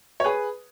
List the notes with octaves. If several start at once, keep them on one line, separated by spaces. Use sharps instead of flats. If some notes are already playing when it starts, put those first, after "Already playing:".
C#5
G#4 B4